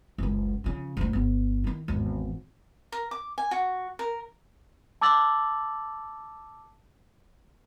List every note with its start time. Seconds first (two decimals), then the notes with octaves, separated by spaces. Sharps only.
0.18 F#1 C#2
0.64 C#3 F3
0.97 F#1 D2
1.13 G1 B3
1.64 D#3 E4
1.88 G#1 E2
2.92 A#4
3.11 D6
3.38 G#5
3.51 F#4
3.99 A#4
5.01 A5 D6 E6 A6 F#7